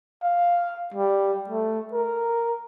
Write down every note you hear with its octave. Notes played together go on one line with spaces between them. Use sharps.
F5
G3
A3
A#4